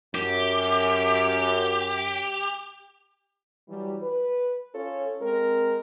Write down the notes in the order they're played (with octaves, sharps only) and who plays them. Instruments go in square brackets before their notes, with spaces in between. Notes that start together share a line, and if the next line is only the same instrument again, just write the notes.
[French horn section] F#2 [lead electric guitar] G4
[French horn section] E3 F#3 G3
B4
C#4 F4 A4 C#5
G#3 C4 A#4